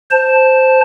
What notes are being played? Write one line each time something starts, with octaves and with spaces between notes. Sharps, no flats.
C5 A5